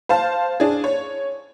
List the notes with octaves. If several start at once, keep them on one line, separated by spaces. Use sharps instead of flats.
C5 F5 A5
D4 G#4
C#5